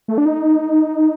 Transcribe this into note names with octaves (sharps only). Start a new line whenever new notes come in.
A3
D4
D#4